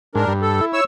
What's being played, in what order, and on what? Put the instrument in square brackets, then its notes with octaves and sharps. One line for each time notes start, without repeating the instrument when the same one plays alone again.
[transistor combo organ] G#2 [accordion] D4 A#4
[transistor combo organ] G2
[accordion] A4
[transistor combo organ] E4
[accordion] C#5 E6